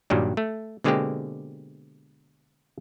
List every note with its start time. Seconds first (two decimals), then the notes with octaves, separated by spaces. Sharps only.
0.10 G2 A#2 D#3 F#3 G3
0.37 A3
0.84 B2 D3 G#3 A#3 C4 G4